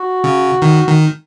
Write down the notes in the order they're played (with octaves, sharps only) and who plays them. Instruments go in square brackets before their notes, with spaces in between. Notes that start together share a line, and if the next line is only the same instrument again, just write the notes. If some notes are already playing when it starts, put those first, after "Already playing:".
Already playing: [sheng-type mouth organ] F#4
[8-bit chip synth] C#3
D#3
D#3